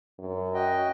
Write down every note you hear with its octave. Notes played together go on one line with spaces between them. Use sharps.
F#2
F#4 D#5 G5